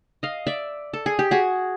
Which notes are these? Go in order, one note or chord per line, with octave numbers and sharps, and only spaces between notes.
D#5 F5
D5 E5
A4
G#4
G4
F#4 G#4